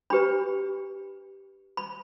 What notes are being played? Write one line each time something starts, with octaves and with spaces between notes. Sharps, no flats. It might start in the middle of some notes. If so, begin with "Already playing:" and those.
D4 G4 B4 B5
B5